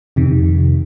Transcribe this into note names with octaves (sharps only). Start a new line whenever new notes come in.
F2 C3 D#3